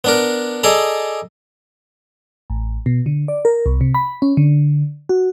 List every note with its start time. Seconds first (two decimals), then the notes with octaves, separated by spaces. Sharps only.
0.04 B3 D4 A#4
0.63 G#4 A4 D5 D#5 A5 A#5
2.50 A1
2.86 B2
3.06 D3
3.28 D5
3.45 A#4
3.66 C2
3.81 C3
3.94 B5
4.22 C#4
4.37 D3
5.09 F#4